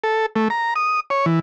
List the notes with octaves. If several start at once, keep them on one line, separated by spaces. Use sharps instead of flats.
A4
A3
A#5
D#6
C#5
E3